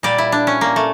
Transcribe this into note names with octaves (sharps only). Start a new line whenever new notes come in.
A#2 G3 D5
E4
D4
C#4
A#3
A3